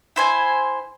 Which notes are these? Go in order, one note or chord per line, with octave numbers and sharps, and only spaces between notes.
E4 C5 G#5